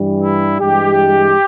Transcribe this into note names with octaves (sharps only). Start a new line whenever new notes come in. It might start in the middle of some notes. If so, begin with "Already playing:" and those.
Already playing: G2 E3 G3
E4
G2 E3 G#3 G4